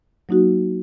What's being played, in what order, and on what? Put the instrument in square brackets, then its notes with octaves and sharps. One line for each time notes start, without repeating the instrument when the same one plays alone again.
[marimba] F#3 A#3 D#4 F#4